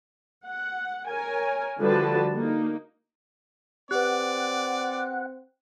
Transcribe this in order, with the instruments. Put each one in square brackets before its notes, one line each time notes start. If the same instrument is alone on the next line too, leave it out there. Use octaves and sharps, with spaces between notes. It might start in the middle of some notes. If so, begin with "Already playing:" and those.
[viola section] F#5
A#4 C#5 G#5
D3 F3 G3 F#4 B4 A5
A#3 D#4
[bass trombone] C4 [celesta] G4 B4 [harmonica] D5 [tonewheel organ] F#5